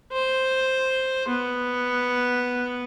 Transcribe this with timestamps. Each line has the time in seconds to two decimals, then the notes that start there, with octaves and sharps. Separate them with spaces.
0.13 C5
1.28 B3